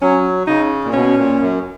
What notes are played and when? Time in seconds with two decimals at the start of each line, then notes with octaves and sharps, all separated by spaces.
0.02 F#3 C#4
0.47 C#3 D#4
0.84 A#2
0.93 B2 C#4
1.17 A#2
1.40 F#2